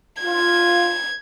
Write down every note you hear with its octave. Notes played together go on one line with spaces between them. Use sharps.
F4 G#6